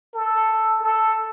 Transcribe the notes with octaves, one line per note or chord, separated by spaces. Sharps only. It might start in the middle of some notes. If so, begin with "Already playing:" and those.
A4
A4